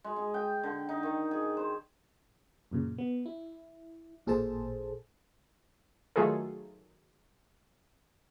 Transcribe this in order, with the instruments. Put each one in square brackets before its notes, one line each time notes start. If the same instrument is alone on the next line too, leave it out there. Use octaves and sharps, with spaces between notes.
[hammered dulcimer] G#3
G#4
G5
D3
D#4
D#3
G#4
C5
[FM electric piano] F#2 A#2 C#3
B3
E4
A1 A#2 G#4 A4 C5 A5
[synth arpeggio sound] D#3 F#3 A3 F4 G#4 A4